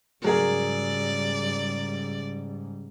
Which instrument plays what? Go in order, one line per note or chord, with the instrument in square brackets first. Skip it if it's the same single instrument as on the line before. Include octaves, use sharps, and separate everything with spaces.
[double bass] G#2 G3 [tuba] C#3 [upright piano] F#3 G#4 A#4 [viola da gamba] D5